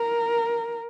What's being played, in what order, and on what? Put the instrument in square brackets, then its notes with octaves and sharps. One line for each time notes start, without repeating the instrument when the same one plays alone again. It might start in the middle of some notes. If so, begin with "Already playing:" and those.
Already playing: [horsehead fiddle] A#4